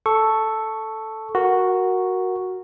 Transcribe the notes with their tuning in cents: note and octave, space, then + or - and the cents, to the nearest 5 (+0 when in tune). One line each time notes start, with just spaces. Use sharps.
A4 +0 C#6 +0
F#4 +0 A#4 +0